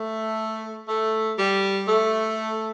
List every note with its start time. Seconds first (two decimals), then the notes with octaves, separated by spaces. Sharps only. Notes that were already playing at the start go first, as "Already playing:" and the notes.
Already playing: A3
0.88 A3
1.38 G3
1.87 A3